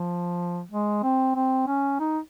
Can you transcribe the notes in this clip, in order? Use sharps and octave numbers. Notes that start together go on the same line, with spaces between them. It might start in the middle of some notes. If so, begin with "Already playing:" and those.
Already playing: F3
G#3
C4
C4
C#4
D#4